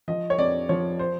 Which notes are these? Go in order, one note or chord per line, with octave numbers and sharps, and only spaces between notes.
F3 D#5
C#5
F2 D5
F3 C#5
C5